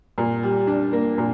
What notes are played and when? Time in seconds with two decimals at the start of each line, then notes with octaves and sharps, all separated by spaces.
0.18 A#2
0.43 G3
0.67 D4
0.93 A#3
1.18 A#2